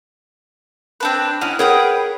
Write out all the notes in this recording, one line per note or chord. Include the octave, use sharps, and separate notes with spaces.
C4 D4 B4
C#4 D#4 E4 F#5
G#4 A#4 B4 C#5 F#5 G5